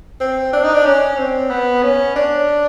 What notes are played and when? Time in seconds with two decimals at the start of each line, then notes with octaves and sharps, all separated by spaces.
0.21 C4
0.53 D4
0.64 D#4
0.74 D4
0.86 C#4
1.17 C4
1.50 B3
1.83 C#4
2.16 D4